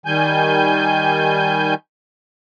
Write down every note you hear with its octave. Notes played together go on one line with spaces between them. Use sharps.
D#3 G3 G#5 G6